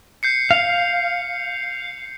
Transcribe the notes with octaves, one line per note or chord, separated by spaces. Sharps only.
G6 C7 C#7
F5